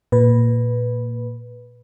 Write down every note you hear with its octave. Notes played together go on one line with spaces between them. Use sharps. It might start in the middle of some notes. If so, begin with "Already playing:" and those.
A#2 B4